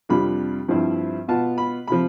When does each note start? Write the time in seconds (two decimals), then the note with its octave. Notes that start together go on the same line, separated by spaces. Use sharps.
0.09 F2 C3 G3 D4 F4 B5
0.68 G2 F3 C4 E4
1.28 B2 B3 F4 A5
1.58 B5
1.87 C3 F3 B5